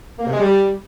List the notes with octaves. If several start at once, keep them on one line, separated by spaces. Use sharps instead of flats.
A#3
C3
G#3
G3